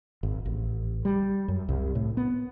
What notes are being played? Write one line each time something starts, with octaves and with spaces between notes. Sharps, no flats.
G#1
A1
G3
F#2
C2
A2
B3